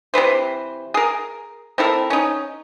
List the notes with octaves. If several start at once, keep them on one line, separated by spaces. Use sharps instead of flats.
C3 E3 B4 C5
G#4 A#4
C4 E4 A4 A#4
C#4 D#4